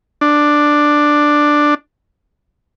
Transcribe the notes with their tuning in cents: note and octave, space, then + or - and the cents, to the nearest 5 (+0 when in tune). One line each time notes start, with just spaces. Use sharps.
D4 +5